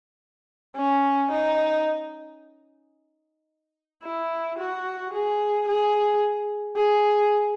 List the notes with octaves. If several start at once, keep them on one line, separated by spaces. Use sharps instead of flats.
C#4
D#4
E4
F#4
G#4
G#4
G#4